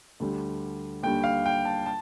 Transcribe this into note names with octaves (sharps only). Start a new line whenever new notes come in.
D2 D3 G3
D#2 D3 G3 G5
F5
G5
A5
A5